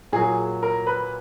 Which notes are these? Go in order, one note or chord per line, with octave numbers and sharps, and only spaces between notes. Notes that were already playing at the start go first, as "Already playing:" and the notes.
A#2 F#3 G#4
A#4
B4